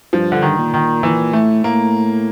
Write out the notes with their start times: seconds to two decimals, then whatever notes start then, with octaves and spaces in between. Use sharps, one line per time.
0.13 G2 F3
0.32 D3
0.42 D#3
0.58 A#2
0.74 D#3
1.03 A#2 E3
1.33 A2 A3
1.64 A2 A#3